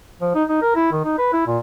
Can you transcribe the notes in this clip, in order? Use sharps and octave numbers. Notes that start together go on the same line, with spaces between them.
F3
D#4
D#4
A#4
E4
D#3
D#4
B4
E4
A#2